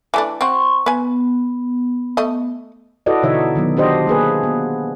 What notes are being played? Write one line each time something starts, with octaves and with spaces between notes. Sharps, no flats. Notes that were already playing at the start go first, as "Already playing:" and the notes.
E3 A3 D4
C4 F#4 C6 C#6
B3 B4 G#5
A3 D#5
E4 F#4 A4 B4 D5 D#5
B2 D3 E3 D#4 C#5 E5
D#3 F#3 B3
D4 G4 C5 D#5
A#3 G#4 B4
B3